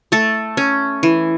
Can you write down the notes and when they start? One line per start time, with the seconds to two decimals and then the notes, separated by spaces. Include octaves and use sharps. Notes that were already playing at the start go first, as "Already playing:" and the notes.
0.12 A3 A4
0.57 C#4
1.03 E3